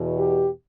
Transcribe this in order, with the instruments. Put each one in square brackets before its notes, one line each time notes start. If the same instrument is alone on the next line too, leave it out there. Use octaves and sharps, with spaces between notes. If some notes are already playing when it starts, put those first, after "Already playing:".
Already playing: [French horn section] E2 B2
G4